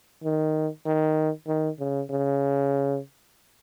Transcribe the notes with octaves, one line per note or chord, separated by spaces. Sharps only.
D#3
D#3
D#3
C#3
C#3